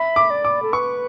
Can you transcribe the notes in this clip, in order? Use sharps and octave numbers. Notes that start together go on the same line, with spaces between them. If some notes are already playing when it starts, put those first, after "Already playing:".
Already playing: E5 B5
D6
D5
D6
A4
B4 C#6